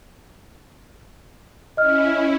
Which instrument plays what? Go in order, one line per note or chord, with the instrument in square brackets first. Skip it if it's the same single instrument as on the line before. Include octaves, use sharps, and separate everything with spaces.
[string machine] C#4 E4 [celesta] D#5 F6